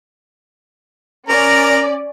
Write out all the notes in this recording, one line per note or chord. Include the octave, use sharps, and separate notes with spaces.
C#4 A#4 D5 A#5